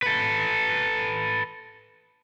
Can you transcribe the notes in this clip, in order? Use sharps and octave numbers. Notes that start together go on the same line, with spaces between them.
A4 B4